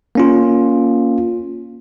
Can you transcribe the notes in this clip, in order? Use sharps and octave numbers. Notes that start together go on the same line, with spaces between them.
A#3 C#4 F4